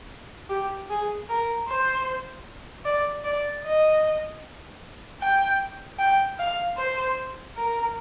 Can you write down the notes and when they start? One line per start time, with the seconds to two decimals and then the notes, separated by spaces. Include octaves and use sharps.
0.50 G4
0.90 G#4
1.29 A#4
1.68 C5
2.85 D5
3.24 D5
3.64 D#5
5.22 G5
5.99 G5
6.39 F5
6.78 C5
7.57 A#4